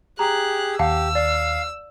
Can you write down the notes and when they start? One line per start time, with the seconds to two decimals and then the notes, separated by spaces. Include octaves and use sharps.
0.19 G4 G#4 A#5 F#6
0.79 D#2 G4 F5 F#5 A5 E6
1.15 D5 F5